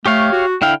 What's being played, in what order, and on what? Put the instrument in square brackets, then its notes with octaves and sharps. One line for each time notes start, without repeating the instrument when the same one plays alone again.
[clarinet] A3 [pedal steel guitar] G4 C#5 F5
[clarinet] F#4
[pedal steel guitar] D3 E4 F5 [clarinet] G5